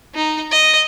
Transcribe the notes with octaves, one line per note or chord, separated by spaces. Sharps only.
D#4
D#5